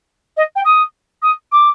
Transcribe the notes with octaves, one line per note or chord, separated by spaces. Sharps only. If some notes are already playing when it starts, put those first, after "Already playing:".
D#5
G5
D#6
D#6
D6